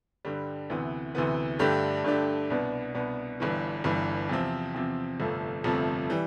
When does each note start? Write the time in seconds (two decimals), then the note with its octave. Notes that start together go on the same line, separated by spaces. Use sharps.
0.25 G2 D3 G3
0.70 D2 C3 E3 B3
1.15 D2 C3 E3 B3
1.59 G2 D3 A3 D4 G4
2.04 G2 D3 A3 D4 G4
2.50 C2 B2 B3 D4
2.94 C2 B2 B3 D4
3.40 G1 G2 E3
3.84 G1 G2 E3
4.29 E2 C3 F3 C4
4.74 E2 C3 F3 C4
5.20 G1 F2 C3 F3 A3
5.64 G1 F2 C3 F3 A3
6.10 E3 G3